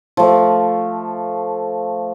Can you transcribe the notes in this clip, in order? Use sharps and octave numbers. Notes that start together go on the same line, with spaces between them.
F3 A3